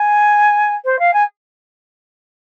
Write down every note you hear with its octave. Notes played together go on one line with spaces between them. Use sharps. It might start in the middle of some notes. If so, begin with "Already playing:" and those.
Already playing: G#5
C5
F5
G#5